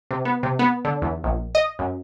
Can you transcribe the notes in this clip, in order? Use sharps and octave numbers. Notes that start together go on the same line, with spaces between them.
C3
B3
C3
B3
D3
E2
A#1
D#5
F#2